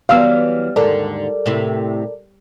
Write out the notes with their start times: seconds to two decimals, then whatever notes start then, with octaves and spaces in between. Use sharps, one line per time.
0.09 E3 F#3 G3 B3 F5 E6 F6
0.76 D#2 G#2 D3 A4 A#4 D5
1.46 A2 C3 E4